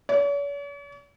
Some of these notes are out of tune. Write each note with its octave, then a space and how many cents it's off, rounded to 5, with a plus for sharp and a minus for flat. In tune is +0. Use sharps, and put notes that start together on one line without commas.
C#5 +45